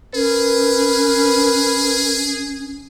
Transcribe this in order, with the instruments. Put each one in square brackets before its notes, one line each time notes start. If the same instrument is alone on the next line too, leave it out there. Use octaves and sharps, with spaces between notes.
[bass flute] C#4 [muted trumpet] G#4 [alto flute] A#4 [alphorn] B4